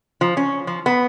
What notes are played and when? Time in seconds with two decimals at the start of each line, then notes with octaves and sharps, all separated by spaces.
0.21 F3
0.37 C#4
0.67 F3
0.86 B3